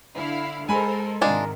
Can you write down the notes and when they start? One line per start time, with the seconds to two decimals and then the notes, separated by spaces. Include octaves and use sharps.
0.15 D3 E4 F5
0.69 G#3 A4 A#4 C5 G#5 B5
1.21 G#2 C3 D#3 G#3 D4 F4 A#4